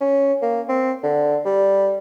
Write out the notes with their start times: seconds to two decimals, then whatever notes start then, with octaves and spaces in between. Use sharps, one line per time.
0.01 C#4
0.42 A#3
0.69 C4
1.03 D3
1.45 G3